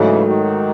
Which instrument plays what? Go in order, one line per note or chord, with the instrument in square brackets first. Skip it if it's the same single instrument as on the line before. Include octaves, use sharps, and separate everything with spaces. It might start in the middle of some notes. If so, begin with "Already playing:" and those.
Already playing: [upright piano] G#2 F#3 A3 D#4 A4 [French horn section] C#3 E3
[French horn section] D#3 F#3